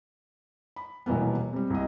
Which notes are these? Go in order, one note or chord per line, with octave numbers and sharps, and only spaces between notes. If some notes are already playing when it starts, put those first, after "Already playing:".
B5
D#1 B2 E3 A#3 B3
C3 G3
C2 D#5